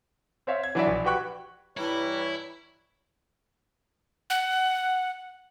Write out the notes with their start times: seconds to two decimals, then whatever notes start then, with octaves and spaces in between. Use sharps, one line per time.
0.47 C4 C#5 E5 F5
0.63 G#6
0.75 E3 F#3 D4 E4 D5 E5
0.87 A#1
1.04 F#4 G4 B4 G5 C#6 F#6
1.77 G2 E3 G3 D4 E4 B4 C#5 A#5
4.30 F#5